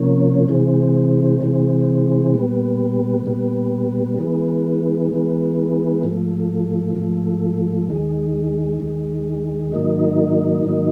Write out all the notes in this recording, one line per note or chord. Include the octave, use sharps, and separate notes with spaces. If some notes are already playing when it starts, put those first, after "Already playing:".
Already playing: C3 F3 A#3 C#4
C3 E3 G#3 C4
C3 E3 G#3 C4
A#2 G3 B3
A#2 G3 B3
E3 G#3 B3
E3 G#3 B3
G#2 F3 A3
G#2 F3 A3
D#2 D#3 G#3
D#2 D#3 G#3
G#2 D#3 F#3 A#3 D#4
G#2 D#3 F#3 A#3 D#4